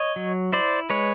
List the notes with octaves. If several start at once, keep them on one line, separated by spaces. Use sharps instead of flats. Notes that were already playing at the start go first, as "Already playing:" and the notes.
Already playing: C#5 D#5
F#3
E4 C5 D5
G#3 B4 C#5